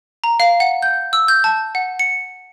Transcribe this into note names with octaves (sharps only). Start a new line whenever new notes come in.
A#5
F5
F#5
G6
E6
G6
A5
F#5
C#7